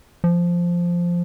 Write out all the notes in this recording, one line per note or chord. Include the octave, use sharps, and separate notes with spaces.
F3